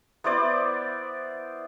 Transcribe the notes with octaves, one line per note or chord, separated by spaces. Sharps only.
B3 E4 C5 D5